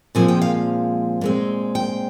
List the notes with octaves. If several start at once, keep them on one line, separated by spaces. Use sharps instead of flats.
A#2 F3 G#3 C4 G#5
G5
F5
A#2 G#3 C4
G5